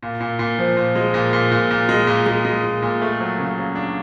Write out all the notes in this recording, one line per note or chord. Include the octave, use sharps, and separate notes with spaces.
A#2
A#2
A#2
F3
A#2
G#3
A#2
A#2
A#2
A#2
G#3
A#2
G#3
G#3
A#2
A#2
A3
F#3
C#3
F#3
D4